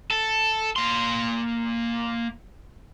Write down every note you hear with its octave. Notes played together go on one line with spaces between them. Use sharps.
A4
A#3 C6